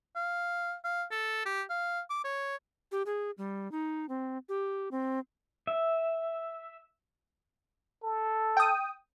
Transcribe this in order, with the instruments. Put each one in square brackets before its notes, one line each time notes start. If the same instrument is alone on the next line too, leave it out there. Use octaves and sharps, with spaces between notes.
[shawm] F5
F5
A4
G4
F5
D6
C#5
[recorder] G4
G#4
G3
D#4
C4
G4
C4
[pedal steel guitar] E5
[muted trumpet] A4
[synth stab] G5 D#6